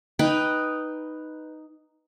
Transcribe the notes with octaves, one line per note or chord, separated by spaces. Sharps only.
D#4 B4 G5